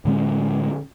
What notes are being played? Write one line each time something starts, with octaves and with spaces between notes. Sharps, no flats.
A2 D3 G#3 C#4